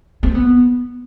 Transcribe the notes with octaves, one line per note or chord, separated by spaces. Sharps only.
C4
B3